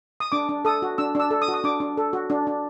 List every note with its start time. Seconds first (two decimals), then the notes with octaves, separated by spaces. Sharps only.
0.20 D#6
0.32 D4 D6
0.49 D4
0.65 A4 D#6
0.82 F#4
0.98 D4 E6
1.15 D4 E6
1.31 A4
1.42 D#6
1.48 F#4
1.54 D#6
1.64 D4 D6
1.80 D4
1.97 A4
2.13 F#4
2.30 D4
2.47 D4